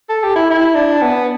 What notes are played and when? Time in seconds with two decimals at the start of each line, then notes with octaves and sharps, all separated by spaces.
0.09 A4
0.23 G4
0.36 E4
0.50 E4
0.75 D4
1.02 B3